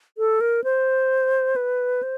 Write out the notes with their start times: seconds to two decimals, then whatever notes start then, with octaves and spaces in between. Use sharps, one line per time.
0.18 A4
0.41 A#4
0.64 C5
1.56 B4
2.03 C5